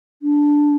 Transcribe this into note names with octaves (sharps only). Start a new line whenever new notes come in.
D4